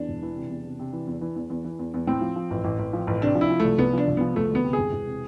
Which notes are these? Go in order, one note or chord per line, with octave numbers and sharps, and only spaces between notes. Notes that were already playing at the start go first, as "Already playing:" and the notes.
Already playing: E2 D4
E1
E3
C3
E2
C3
C3
E3
E2
E3
E2
E2
E3
E2
E2
A2 C4
F3
F3
A1
A1
A1
F3
A1
C3 D4
F3
E4
F3
C2 A3
C2 B3
F3 D4
C2
F3 B3
E1 A3
D2 B3
C3
G#4
E1
E1
C3